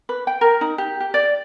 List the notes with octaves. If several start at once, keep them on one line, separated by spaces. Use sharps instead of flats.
B4
G5
A#4
D#4
G4
G4
D5